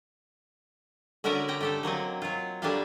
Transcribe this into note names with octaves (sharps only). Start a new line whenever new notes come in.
D3 C#4 F#4 A#4 D5 E5
G4 G5 A#5
A3 G4 A4
F#3 A#3 C4 D#5
F#3 F4
G3 A3 A#3 D4 G4 F5